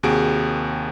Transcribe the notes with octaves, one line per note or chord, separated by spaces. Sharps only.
D#2 C3 F#4 G#4 D7